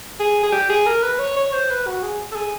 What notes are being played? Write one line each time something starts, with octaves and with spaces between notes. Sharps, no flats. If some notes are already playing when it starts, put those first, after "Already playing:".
G#4
G#4
G4
G#4
A#4
B4
C#5
C#5
C5
B4
F#4
G#4
A4
G#4